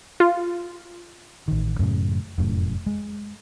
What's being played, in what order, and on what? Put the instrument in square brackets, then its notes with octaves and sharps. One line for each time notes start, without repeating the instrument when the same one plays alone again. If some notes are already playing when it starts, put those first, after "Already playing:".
[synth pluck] F4
[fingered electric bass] A1 D#3
F#2 A2 C#3
F1 F#2 A2
G#3